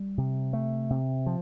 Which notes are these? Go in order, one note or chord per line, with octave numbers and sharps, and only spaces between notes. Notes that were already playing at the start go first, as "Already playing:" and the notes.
Already playing: G3
C3
A3
C3
F3